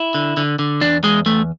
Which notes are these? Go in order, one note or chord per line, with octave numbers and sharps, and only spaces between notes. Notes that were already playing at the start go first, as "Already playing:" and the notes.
Already playing: E4
D3
D3
D3
E2 D4
E2 G#3
E2 A3